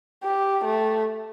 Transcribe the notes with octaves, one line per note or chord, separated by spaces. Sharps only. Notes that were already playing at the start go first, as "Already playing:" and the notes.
G4
A3